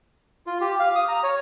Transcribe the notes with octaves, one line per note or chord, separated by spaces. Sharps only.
F4
G4
F5
D#6
A#5
C#5